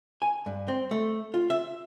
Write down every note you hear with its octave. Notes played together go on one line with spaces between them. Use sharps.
G#5
G2
C4
A3
F4
E5